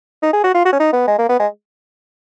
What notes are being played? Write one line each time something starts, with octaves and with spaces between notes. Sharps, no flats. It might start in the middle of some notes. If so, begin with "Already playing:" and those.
D#4
G#4
F#4
F4
F#4
C#4
D#4
B3
G#3
A#3
B3
G#3